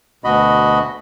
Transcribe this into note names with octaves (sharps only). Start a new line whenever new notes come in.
D2 B2 F#4 D#5 B5